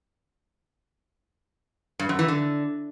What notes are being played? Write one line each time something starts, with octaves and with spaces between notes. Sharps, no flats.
G2
F#2
E3
D3